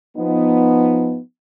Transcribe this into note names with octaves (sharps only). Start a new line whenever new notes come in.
F3 B3 D#4